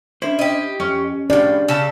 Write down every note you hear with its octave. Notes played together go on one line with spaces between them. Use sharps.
C#4 D4 E4 C5
G4 D#5
F2 C#4
A2 F3 D4 G4 G#4 D5
C#3 C#4 A5 E6